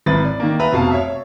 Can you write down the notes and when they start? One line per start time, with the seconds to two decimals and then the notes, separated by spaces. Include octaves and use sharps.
0.06 G#1 E4 B4 A6
0.25 D5
0.40 D#3 A#3
0.60 B4 E5 A#5
0.73 F1 B2 F5 A5
0.91 C#5 E5